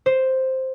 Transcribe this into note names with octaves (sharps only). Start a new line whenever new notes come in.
C5